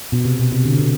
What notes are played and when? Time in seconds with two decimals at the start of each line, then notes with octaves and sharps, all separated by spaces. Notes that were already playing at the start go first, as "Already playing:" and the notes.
0.12 B2
0.25 C3
0.39 B2
0.52 C3
0.65 D3
0.78 C3